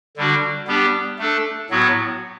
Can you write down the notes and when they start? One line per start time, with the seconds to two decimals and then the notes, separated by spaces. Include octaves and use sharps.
0.17 D3 G3 D4 F#4
0.67 G3 B3 D4 G4
1.19 A3 D4 A4
1.70 A2 F#3 B3 F#4